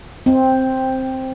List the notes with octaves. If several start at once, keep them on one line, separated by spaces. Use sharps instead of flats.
C4